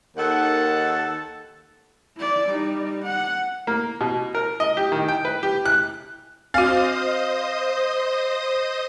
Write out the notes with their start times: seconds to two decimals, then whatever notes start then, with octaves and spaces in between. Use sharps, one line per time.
0.17 D#2 D#3 A4 F#5
2.17 E4 D5
2.48 G3 D#4
3.03 F#5
3.67 A#3
4.01 B2
4.35 A#4
4.60 D#5
4.77 G4
4.92 D#3
5.08 G5
5.25 B4
5.43 G4
5.66 F#6
6.54 C4 F#4 C5 D#5 F5 D#6